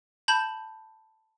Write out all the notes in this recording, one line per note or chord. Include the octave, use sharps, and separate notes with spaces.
A5 B5 G6